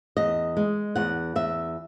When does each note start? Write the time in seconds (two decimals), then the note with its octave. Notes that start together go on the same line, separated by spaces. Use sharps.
0.17 E2 D#5
0.57 G#3
0.95 E2 F#5
1.36 E2 E5